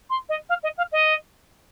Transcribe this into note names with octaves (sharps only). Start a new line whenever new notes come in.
C6
D#5
F5
D#5
F5
D#5